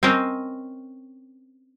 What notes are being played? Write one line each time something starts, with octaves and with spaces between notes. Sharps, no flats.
C4 C#4 A#4 C5 D#5